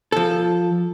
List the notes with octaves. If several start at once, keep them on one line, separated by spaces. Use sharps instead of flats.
F3 A4